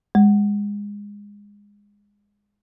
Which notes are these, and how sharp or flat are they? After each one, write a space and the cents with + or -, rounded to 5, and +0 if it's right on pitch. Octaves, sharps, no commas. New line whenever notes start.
G#3 -25